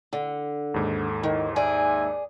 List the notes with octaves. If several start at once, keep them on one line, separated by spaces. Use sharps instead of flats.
D3
D#2 G#2
D#3
G#4 D5 E5 G#5